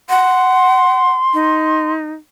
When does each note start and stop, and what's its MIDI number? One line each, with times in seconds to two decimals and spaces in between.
0.09 1.10 78
0.09 1.91 84
1.34 2.11 63